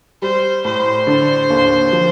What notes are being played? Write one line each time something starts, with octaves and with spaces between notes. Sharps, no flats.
G3 C5
A2 C5
D3
D#2
F3